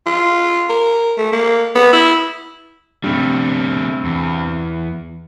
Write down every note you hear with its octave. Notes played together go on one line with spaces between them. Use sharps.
F4
A#4
A3
A#3
B3
E4
G2 C3 G3 A3
E2